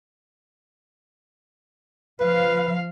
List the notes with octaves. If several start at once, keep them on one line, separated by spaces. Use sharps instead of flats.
F3 B4 F5